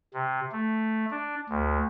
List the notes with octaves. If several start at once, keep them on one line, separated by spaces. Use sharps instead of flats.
C3
A3
D4
D2